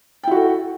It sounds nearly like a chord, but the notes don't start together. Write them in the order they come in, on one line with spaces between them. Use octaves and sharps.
G5 E4 F#4 A4